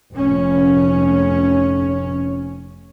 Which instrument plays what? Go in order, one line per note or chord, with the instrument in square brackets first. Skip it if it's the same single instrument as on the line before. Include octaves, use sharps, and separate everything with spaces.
[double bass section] F1 C#4